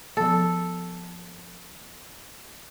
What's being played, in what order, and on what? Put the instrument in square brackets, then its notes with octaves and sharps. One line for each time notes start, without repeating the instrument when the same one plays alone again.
[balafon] F3 B3 [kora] A4